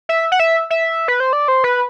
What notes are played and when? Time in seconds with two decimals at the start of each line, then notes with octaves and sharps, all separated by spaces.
0.09 E5
0.32 F#5
0.40 E5
0.70 E5
1.08 B4
1.20 C5
1.33 D5
1.48 C5
1.64 B4